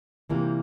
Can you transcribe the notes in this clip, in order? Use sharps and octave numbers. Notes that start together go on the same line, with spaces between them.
C3 E3 G3 A#3 F4